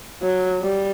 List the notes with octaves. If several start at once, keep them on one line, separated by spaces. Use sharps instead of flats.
F#3
G3